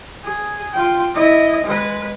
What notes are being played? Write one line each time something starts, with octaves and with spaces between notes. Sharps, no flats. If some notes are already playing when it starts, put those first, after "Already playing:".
G#4
F4 G5
E4 D#5
G#3 B4